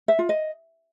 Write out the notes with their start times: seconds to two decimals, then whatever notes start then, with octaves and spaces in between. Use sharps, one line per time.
0.08 E5
0.19 F4
0.29 D#5